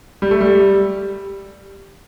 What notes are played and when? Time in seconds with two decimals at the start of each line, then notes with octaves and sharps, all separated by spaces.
0.22 G3
0.31 A3
0.41 G3